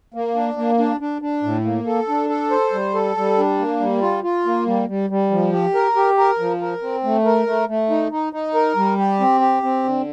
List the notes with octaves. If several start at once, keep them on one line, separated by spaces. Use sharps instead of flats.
A#3
D4
A#3
D4
D4
D4
A2
A#3
A4
D4
A4
C5
G3
A4
G3
D4
A#3
G3
F4
F4
A#3
G3
G3
G3
F3
G4
A#4
G4
A#4
F3
A#4
C4
A3
A#4
A3
A3
D#4
D#4
D#4
A#4
G3
G4
C4
G4
C4
D3